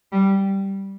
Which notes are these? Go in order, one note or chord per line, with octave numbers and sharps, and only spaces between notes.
G3